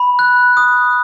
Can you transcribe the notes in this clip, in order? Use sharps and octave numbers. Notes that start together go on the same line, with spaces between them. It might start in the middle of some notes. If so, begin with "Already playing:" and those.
Already playing: B5
F#6
D#6